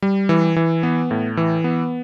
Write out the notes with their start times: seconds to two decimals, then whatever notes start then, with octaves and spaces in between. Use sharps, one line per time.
0.02 G3
0.29 E3
0.56 E3
0.83 B3
1.11 A2
1.37 E3
1.64 B3